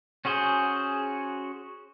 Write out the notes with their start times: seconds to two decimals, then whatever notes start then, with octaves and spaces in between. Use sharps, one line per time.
0.25 C#4 F#4 G#4 C5